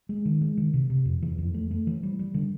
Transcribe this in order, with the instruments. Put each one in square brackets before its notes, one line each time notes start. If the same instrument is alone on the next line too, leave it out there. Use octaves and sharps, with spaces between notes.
[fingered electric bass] G#3
D#3
G#3
D#3
C3
C3
F2
E3
F2
A3
A3
E3
G3
G3
D3